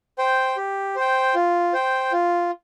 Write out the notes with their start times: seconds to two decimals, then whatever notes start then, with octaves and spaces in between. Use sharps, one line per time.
0.18 C5 G5
0.57 G4
0.96 C5 G5
1.35 F4
1.73 C5 G5
2.12 F4